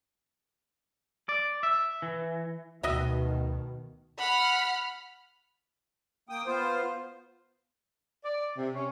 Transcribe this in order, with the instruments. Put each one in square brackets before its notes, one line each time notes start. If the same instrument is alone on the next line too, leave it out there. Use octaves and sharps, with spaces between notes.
[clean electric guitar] D5
E5
E3
[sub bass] D2 [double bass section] B2 D#3 [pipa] F#4 D#5 E5
[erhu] F#5 [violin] B5 F6
[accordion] A#3 G5 D#6
B3 F4 C5
[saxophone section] D5
C3
C#4